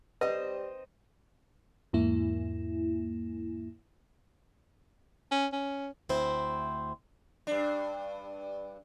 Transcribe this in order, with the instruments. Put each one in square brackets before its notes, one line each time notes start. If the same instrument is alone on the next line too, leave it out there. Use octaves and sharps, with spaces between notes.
[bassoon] G3 [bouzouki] C4 D#4 C5 [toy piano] B4 [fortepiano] D#5
[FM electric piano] E2 G#2 A#3 E4
[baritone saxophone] C#4
C#4
[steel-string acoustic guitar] D2 C4 E4 C5
[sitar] G2 D4